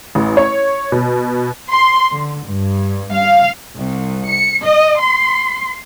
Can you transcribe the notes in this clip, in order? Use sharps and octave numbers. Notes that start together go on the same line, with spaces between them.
A1
C#5
B2
C6
D3
G2
F5
C2
C#7
D#5
C6